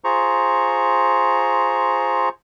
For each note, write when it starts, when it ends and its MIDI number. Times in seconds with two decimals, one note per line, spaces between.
0.04 2.29 65
0.04 2.29 68
0.04 2.29 72
0.04 2.29 82
0.04 2.29 85